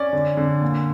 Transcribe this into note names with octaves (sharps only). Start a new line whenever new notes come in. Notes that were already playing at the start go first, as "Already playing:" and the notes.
Already playing: C#4 D5
D3
D3
A#2